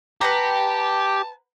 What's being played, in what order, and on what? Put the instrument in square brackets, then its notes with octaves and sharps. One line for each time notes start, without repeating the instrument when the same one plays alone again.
[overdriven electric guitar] G4 [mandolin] B4 F#5 A#5 [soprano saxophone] A5